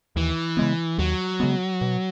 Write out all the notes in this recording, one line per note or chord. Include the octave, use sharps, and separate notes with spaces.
D#2 E3
C#3 G#3 B3
D#2 F#3
C#3 G#3 B3
B2